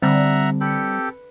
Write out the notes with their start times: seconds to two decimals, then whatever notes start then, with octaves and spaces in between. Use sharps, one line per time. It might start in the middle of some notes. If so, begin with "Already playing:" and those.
0.02 D3 G3 C4 E5 F#5 A#5
0.61 G4 A4 B4 C#7